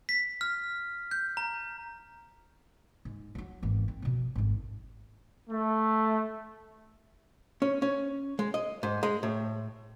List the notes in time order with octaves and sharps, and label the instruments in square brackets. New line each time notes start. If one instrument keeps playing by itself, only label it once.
[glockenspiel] B6
F6
G6
A#5
[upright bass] G#2
F3 F#3
G#1 E2
C4
B2 F3
G#1 F2
[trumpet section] A3
[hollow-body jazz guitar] C#4
C#4
G#3
D#5
G#2
G#3
A2